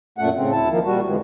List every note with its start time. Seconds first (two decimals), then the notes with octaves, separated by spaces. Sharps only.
0.18 F#2 A#2 A3 F#5
0.36 A2 C#3 C4
0.52 D2 E4 A5
0.70 D#3 F3 A#3
0.85 A#2 G3 F#4
1.06 F2 G#2 D3 E3 F3 G#3